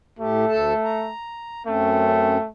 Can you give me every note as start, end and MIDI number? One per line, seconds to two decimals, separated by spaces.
0.19 0.45 45
0.19 1.11 57
0.19 0.45 67
0.49 0.74 38
0.49 0.74 69
0.49 0.74 81
0.84 1.63 82
1.66 2.38 42
1.66 2.48 57
1.66 2.38 60
1.66 2.38 61